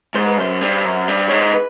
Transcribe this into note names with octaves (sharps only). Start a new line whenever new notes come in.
G#2 C5
B4
F#2 C5
G2
F#2
G2
G#2 C#5
C5
B4